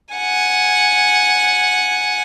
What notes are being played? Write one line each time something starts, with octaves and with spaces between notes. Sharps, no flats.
F#5 G#5